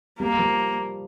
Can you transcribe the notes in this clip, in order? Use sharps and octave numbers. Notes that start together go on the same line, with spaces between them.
G3 A#3
F3